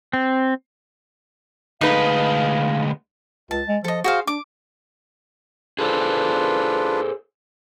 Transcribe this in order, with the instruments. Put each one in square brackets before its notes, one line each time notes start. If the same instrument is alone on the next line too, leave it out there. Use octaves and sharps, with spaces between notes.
[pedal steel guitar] C4
[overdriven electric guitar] D2 G#3 [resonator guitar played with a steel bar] D#4 B4 [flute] F5
[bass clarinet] C#2 [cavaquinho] A5
[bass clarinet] G#3
[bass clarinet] F3 [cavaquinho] A4 D#5
[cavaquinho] F#4 C5 F5 [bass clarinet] G#4
[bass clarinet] D4 [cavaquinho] D6
[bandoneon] D4 F4 B4 [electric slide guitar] G#4 A4 C5